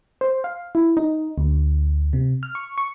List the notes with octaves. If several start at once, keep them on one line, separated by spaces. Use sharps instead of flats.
C5
F5
E4
D#4
D2
C3
F6
C#6
C#6